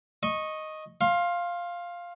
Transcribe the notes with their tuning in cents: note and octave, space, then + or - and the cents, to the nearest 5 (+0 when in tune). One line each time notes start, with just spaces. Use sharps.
D#5 +0 C#6 -15
F5 +0 C6 +25